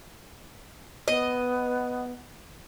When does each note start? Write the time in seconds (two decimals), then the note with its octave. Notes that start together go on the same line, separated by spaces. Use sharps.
1.08 B3 D#5